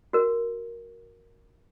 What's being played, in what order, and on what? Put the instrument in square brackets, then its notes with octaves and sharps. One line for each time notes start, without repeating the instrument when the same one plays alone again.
[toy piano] F#4 A#4